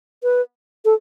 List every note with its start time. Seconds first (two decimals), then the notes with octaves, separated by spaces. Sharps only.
0.23 B4
0.85 A4